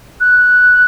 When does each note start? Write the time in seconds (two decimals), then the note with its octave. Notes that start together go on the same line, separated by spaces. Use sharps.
0.20 F#6